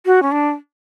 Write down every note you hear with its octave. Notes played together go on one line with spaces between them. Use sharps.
F#4
C#4
D4